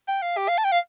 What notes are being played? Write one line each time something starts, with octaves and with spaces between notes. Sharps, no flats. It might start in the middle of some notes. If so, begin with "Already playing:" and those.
G5
F5
G4
F5
A5
G5
F5